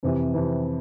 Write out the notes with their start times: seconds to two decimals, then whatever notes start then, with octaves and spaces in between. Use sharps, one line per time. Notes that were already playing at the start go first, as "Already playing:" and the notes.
0.03 F2 C3 E3
0.34 F2 C3 E3